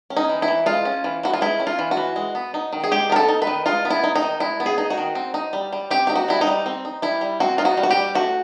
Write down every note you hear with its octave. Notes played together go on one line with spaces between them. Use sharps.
C#4
D#4
E3
E4
E3
G#3 F4
C#4
E3
E3 F#4
F4
G#3 E4
C#4
F4
E3
F#4
E3
G#3
B3
D#4
D#3
G#4
G#3 G4
B3 A#4
A4
D#4
B4
D#3
G#3 F4
B3
E4
D#4
D#4
D#3
G#3 E4
B3
G#4
D#4
F#4
D#3
C4
D#4
G3
G3
C4 G4
D#4 G4
F#4
G3 E4
D#4
G3
C4
D#4
G3 E4
G3
C4 F#4
D#4 F4
F#4
G3
F#4
G4
G3
A3 F#4